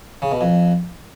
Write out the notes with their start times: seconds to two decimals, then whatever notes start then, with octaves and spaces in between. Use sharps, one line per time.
0.22 C#3
0.31 B2
0.41 F2